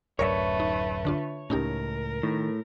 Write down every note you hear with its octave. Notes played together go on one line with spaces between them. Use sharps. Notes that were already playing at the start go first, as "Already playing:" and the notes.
D1 F#2 A3 A#4 B4 C#5 D5 E5
D#4
D3 D4 F4
C#2 A2 C#4 D#4 G4 A#4
A2 D#3